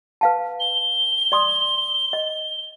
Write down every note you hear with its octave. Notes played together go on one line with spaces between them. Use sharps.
B4 F5 A5
G7
D5 C6 D#6
D#5